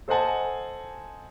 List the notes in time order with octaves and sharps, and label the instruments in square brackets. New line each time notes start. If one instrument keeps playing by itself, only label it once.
[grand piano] A4 C5 D#5 F#5 G#5 A5